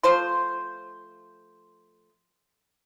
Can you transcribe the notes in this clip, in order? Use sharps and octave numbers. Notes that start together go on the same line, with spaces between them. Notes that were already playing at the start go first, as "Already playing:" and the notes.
F3 A3 C5 C6